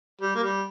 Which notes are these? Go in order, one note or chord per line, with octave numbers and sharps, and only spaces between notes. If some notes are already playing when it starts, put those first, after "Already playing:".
G3
A#3
G3